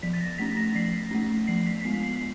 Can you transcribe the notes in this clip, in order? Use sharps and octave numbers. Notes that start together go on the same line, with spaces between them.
F3 B6
A6
A#6
A3 C#4 B6
A#6
F3 C7
A3 C#4
F3 C7
B6
B6
G#3 B3 C7
C7